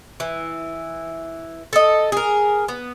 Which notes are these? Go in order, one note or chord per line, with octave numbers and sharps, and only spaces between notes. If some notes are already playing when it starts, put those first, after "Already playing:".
E3
A4 D#5
G#4 A#4
B3